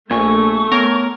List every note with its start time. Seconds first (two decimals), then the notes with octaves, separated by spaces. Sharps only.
0.11 A#1 A3 A#3 G#5 C#6
0.72 B3 A#4 C#5